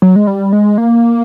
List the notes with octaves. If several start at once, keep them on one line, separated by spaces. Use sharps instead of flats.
F#3
G#3
G3
G#3
A#3